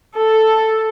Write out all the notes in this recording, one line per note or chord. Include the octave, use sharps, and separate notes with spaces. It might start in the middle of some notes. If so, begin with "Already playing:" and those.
A4